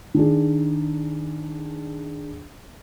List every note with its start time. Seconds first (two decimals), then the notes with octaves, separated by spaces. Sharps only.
0.14 D#3 D4 G#4